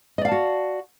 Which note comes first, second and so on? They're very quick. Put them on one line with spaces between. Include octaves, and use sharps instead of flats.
D#5 D5 F5 A5 F#4